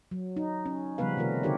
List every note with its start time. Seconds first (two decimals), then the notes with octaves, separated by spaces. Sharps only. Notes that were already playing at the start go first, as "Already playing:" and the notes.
0.11 F#3
0.37 D#4
0.66 C#4
0.98 C#3 F3 G3 B3 B4 F5
1.17 C3 D#3 A3 F4 A#4
1.43 D3 D#4 F#4 G4 A#4 C#5